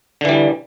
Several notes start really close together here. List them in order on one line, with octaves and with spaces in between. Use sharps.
D3 E3 G3